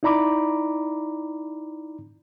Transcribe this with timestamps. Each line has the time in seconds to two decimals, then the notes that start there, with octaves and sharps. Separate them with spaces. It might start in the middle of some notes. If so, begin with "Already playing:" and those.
0.03 D#4 E4 D5 A#5 B5 D6